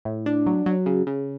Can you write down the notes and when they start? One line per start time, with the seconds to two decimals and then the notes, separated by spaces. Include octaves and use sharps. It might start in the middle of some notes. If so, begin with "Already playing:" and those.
0.05 A2
0.26 D4
0.46 F#3
0.66 F#3
0.86 C#3
1.07 C#3